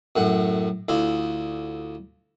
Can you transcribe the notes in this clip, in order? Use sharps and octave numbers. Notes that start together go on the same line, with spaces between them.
F#2 A2 F#5
D2 E4 F4